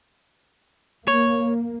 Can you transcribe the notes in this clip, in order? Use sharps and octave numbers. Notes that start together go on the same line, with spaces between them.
A#3 C#5